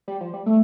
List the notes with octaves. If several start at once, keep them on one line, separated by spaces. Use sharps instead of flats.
G3
F3
G3
A3